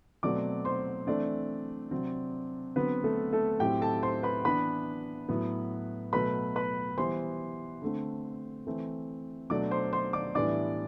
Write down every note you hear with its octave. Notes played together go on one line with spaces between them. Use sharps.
B2 F#3 A3 C4 D5 D6
C5 C6
E3 A3 C4 D4 D5
C3 F#3 C4
D3 F#3 B3 C4 B4
A3 A4
A3 A4
A2 F#3 C4 G4 G5
A4 A5
C5 C6
B4 B5
E3 B3 D4 B4 B5
A2 F#3 B3
B2 F#3 A3 B4 B5
B4 B5
E3 G3 B3 C5 C6
D3 A3 C4
E3 A3 C4
B2 F#3 A3 D4 D5 D6
C5 C6
C5 C6
D5 D6
A2 E3 G3 B3 D4 D5 D6